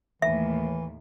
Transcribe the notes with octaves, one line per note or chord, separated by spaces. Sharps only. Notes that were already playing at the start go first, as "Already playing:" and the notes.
D#2 A2 E3 E5